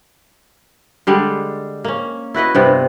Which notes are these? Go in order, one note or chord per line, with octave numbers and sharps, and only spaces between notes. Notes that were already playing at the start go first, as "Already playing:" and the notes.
D3 G3 G#3
A#3 C#4
E4 F#4 B4 D#5
G2 C3 B3 F4